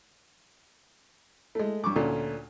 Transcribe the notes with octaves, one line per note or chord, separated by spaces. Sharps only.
G#3 A3
G2 C#6 D6
D2 A#2 A3 C#4